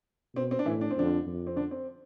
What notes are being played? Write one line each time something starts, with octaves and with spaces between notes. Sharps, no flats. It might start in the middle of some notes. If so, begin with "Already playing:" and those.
B2 C4
C4
D4
A2 E3 E4
D4
C4
F2 D3 D4
F2
C4
D3 D4
C4